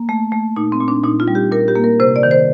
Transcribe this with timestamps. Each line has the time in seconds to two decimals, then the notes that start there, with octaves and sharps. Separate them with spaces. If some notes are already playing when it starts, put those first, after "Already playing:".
Already playing: A#3
0.09 A3
0.32 A3
0.56 A#2 D#4
0.72 C4
0.81 A#2
0.88 D4
1.04 A#2 D#4
1.20 F4
1.28 G3
1.35 G4
1.52 A#2 A#4
1.68 G4
1.76 A#3
1.84 A#4
2.00 C3 C5
2.16 D5
2.23 D#3
2.31 C5